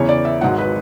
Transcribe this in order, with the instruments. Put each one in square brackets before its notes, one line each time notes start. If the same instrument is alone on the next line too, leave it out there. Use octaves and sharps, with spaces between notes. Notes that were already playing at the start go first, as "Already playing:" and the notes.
Already playing: [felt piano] E2 C#3 E3 C#5
D5
E5
G#1 G#2 F#3 F#5
B4